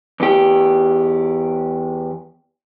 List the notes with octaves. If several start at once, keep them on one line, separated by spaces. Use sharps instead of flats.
E2 G4